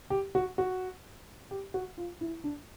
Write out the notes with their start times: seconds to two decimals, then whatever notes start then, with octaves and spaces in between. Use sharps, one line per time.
0.10 G4
0.35 F#4
0.58 F#4
1.51 G4
1.74 F#4
1.98 F4
2.21 E4
2.44 D4